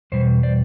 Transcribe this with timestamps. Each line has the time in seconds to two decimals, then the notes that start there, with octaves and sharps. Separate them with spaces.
0.12 E2 B2 G3 C5
0.43 C5 D5